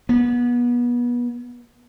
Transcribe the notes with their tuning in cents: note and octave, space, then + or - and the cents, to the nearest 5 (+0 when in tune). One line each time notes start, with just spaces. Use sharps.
B3 -30